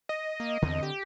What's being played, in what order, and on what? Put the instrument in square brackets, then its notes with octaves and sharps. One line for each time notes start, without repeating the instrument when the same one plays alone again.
[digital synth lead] D#5
[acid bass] A#3
[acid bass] E2 [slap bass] D3 C4
[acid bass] G4